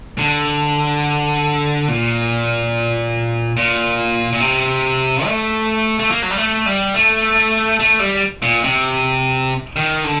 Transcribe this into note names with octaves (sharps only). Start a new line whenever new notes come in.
D3
A#2
A#2
A#2
C3
A3
A3
A#3
F#3
G3
A3
G3
A3
A3
G3
A#2
C3
D#3
D3